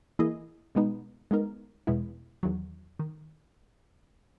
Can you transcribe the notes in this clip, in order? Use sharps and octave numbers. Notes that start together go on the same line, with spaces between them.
E3 A#3 E4 G#4 D#5
B2 G#3 B3 D#4
G#3 B3 D#4 A#4
E2 B2 G#3 B3 E4
E2 D#3 F#3
D#3